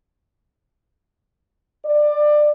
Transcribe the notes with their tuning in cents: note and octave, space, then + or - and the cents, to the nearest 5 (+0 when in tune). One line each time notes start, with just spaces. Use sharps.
D5 +20